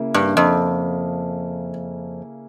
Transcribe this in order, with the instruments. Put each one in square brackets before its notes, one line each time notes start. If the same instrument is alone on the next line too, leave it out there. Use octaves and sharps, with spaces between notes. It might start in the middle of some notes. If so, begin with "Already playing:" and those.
Already playing: [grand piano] C#3 A#3 E4
[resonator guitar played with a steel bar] G2
F2